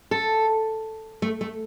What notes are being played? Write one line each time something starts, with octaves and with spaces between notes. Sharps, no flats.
A4
A3
A3